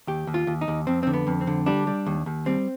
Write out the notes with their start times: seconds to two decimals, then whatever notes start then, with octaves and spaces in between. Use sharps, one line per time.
0.07 D#2 G4
0.27 D#2
0.34 F4
0.47 D#2
0.61 D#4
0.68 D#2
0.87 F2 C4
1.03 D3 C4
1.14 B3
1.27 F2
1.41 C4
1.47 D3
1.66 G3 D4
1.87 G3
2.06 D#2
2.26 D#2
2.46 G3 C4